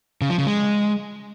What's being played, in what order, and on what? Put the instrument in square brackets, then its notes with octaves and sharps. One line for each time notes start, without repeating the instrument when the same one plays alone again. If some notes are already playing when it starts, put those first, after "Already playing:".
[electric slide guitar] C#3
F3
C#3
G#3